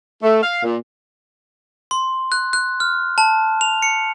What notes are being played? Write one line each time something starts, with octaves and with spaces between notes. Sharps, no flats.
A3
F5
A#2
C6
F#6
F#6
F6
A5
F7
C#7